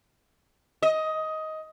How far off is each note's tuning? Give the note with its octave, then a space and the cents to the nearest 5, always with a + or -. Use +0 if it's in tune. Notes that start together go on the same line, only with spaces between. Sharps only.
D#5 +15